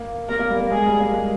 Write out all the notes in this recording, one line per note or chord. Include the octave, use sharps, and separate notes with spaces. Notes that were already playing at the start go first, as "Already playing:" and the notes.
Already playing: A#3
A#3 A#4
A#3
G3
A#3
G#3 G#4
G3
A#3
G#3